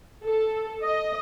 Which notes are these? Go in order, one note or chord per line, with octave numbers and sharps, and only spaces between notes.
A4
D#5